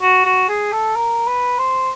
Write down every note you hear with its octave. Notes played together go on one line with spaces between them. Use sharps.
F#4
F#4
G#4
A4
A#4
B4
C5